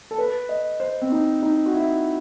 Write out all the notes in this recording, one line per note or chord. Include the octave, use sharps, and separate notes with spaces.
A4
B4
D#5
C5
C4
D#4
D#4
F#4
E4